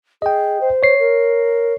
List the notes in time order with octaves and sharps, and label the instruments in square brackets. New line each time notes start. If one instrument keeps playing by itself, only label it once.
[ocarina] G#4 [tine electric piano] D#5 G5
[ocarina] C5
[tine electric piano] C#5 C7
[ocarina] A#4